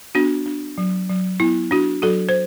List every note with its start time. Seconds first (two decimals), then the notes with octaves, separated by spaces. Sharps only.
0.15 B3 D4 F#4
0.46 D4
0.78 F#3
1.09 F#3
1.40 B3 E4
1.71 D4 F#4
2.02 F#3 F#4 A4
2.29 C5